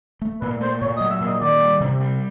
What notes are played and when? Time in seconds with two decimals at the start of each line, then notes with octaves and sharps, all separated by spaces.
0.22 A3
0.41 A#2 B4
0.61 A3 C5
0.81 A#2 C#5
0.97 D#5
1.01 F#3
1.10 E5
1.21 A#2
1.26 D#5
1.41 D#3 D5
1.60 G3
1.80 C3
2.00 G3